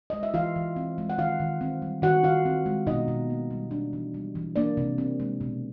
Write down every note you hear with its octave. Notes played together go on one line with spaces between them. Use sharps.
G#3 D#5
E5
E3 F4 F5
E3
C4
G#3
F#5
D#3 F4 F5
D#3
C4
G3
D#3 F#4 F#5
D#3 F4 F5
C4
G#3
B2 D#4 D#5
B2
A#3
G3
D4
E3
G3
E3
A#3 D4 D5
C3
C4
G#3
B2